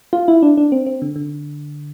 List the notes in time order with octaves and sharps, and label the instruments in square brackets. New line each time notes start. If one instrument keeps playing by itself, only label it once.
[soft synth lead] F4
E4
D4
D4
C4
C4
D3
D3